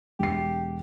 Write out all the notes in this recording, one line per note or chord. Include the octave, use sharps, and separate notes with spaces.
E1 G4 C7